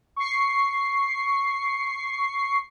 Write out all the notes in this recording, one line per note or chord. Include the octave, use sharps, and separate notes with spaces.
C#6 C7